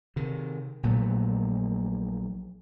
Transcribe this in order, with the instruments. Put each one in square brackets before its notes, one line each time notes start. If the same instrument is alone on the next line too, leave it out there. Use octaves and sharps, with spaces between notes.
[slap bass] C3 D#3
A#1 A#2 F#3 A3